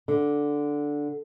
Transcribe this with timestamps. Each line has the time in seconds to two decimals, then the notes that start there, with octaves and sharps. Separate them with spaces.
0.08 D3